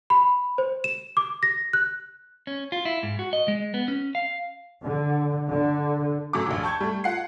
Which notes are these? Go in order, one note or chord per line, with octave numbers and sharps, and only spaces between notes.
B5
C5
E7
D6
A#6
F#6
C#4
F4
E4
G#2
F#4
D#5
G#3
B3
C#4
F5
D3
D3
F#2 F#3 A3 D6
A#1 D#2
A5 C#6 G6 G#6
G3 A3
F4 F#5 C7